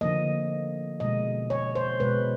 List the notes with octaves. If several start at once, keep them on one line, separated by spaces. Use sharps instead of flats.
D3 F3 A#3 D#5
B2 G#3 D#5
C#5
C5
B2 G#3 B4